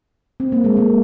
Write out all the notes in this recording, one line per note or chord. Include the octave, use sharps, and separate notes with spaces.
C4
A#3
G#3
A#3